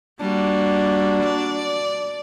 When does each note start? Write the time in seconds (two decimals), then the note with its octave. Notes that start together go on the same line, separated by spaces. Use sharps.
0.20 G3 A#3 D4 F#4
1.23 D5